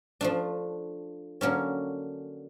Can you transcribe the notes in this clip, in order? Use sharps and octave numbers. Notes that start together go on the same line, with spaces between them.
F3 A3 D4
D3 F#3 A#3 C#4